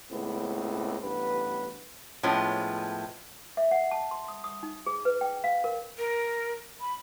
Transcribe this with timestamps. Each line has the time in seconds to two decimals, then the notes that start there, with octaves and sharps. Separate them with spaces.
0.11 C#2 A2 C#3 B3 C4
1.04 A1 G2 B3 B4
2.23 A2 F3 G#3 B3 C#4
3.57 E5
3.71 F#5
3.91 A5
4.11 C6
4.28 D#6
4.44 D#6
4.63 D#4
4.86 G#4
5.05 B4
5.21 G5
5.44 F5
5.64 A#4
5.98 A#4
6.81 B5